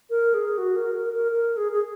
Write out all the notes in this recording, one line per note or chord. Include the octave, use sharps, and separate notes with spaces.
A#4
G#4
F#4
A#4
A#4
A#4
A#4
G#4
G#4